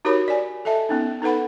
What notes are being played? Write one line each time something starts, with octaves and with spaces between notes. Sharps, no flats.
D#4 F#4 G4 A#4 C#5 B5
D5 G#5
A4 D#5 E5 A5
B3 C#4 D#4
D#4 A4 B4 F#5 B5